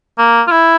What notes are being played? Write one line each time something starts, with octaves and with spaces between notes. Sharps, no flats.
A#3
F4
E4